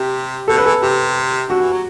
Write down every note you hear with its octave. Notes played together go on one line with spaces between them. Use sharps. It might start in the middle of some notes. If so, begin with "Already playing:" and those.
Already playing: C3 G4
B2 A4
D3 B4
E3 A4
C3 G4
D3 F#4
E3
F#3